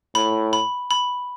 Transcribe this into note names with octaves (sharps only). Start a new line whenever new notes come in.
A2 B5
B5
B5